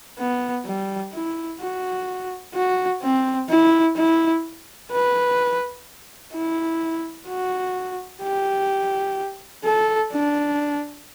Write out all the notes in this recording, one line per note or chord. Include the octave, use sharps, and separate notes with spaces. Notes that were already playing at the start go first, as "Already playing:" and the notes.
B3
G3
E4
F#4
F#4
C4
E4
E4
B4
E4
F#4
G4
A4
D4